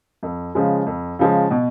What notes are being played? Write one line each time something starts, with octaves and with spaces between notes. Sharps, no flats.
F2
C#3 F3 G#3
F2
C#3 F3 G#3
B2